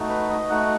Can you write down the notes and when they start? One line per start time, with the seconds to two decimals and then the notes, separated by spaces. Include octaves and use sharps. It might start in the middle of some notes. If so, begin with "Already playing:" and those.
Already playing: A3 D#4 F#4
0.10 B4
0.30 D#5
0.49 A3 D#4 F#4 F#5